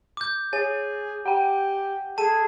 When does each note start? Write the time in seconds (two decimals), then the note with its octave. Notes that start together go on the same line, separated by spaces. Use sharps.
0.17 D6 G6
0.53 G#4 C#5 G#5
1.26 G4 F#5 G5
2.18 G#4 A4 A5 D#7